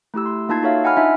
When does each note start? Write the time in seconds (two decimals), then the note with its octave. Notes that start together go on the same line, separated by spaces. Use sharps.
0.14 A3 E4 G4 E6
0.26 C6
0.49 A#3 D#4 F4 A5 G#6 C7
0.63 D#4 F#4 A4 C#5 E5 F5
0.84 D#5 F#5 G#5 B5 F6
0.97 D4 D#4 F4 E5 G#5